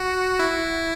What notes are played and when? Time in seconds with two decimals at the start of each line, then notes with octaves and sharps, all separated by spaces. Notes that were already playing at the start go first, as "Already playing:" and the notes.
Already playing: F#4
0.39 E4